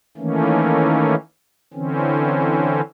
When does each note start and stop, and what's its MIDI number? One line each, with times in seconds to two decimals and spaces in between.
0.17 1.15 51
0.17 1.15 52
0.17 1.15 57
0.17 1.15 58
0.17 1.15 61
1.74 2.81 50
1.74 2.81 52
1.74 2.81 60
1.74 2.81 61